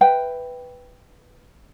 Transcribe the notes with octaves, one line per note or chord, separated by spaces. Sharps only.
B4 E5 G5